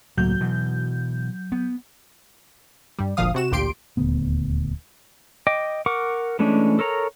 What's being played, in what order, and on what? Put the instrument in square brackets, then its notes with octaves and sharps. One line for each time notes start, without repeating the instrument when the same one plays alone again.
[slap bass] C#2 A2 A#3 [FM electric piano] F#3 G6
[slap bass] B2 E3
B3
[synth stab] G2 G3
G1 D2 A#2 F3 F5 D#6
C3 F#4 E7
A1 D2 A#2 G4 C6 D7
[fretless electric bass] D#1 D2 B3
[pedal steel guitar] D#5 G5 D6
A#4 F#5 C#6 D6
E3 G#3 A3 C#4 D4
A4 A#4 C#5 A#5